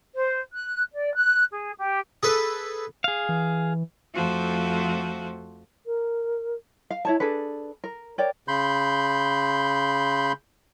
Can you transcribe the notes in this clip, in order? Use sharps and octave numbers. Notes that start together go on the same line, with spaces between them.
C5
F#6
D5
F#6
G#4
G4
G#4 A4 B4
G#4 F5
E3
F2 F3 A3 F#4 A4 C5
A#4
F5
E4 C#5 A5
D4 G#4 A4 B4
A#4
A#4 C#5 D5 G5
C#3 B5 C6 G6